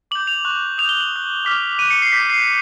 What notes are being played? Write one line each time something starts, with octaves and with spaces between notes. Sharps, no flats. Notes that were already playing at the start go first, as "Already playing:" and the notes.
D6 G6 F#7
F7
C#6 F#6
D#6 G6 F7
G7
F#7
D#6 F#6
D6 F6 B6
C#6 F#6 D#7
C#7
C7
D6 G6 B6
C7